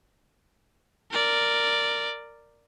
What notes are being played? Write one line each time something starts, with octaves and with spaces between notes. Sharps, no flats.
A#4 D5